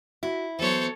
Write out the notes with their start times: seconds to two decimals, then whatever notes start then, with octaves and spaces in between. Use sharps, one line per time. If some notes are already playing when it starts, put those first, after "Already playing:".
0.23 E4 F#4
0.59 E3 F#3 B3 A4 C5 C#5